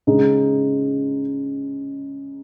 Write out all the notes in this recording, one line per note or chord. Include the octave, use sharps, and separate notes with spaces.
C#3 G#3 D#4